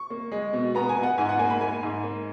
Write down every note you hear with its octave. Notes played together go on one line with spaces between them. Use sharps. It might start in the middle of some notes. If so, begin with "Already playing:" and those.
Already playing: C#6
A#3
G#3
B2
B3 A#5
G#5
B3
F#5
G#2 G#5
F#5
A#3 G#5
B5
A#3 G#5
G#2
A#3